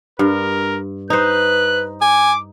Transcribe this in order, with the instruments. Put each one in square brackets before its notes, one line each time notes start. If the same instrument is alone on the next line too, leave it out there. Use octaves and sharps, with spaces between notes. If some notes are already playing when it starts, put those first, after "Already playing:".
[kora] G2 [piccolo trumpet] A#4
[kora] D#4 C5 [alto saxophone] B4 [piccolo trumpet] F#6
[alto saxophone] G#5 [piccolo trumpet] D6